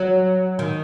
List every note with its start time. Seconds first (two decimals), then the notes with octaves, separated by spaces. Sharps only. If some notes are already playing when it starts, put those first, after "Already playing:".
Already playing: F#3
0.59 D#3